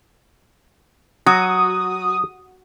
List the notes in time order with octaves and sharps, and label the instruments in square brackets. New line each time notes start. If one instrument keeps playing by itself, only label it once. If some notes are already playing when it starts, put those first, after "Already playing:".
[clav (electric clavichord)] F#3 [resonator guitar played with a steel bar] F#4 [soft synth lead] D#6